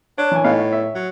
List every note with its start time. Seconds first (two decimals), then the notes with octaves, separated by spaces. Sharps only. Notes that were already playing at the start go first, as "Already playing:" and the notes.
0.18 D4 C#5
0.32 E3 G#5
0.44 A2 B3 D#4 F5
0.72 E5
0.95 F#3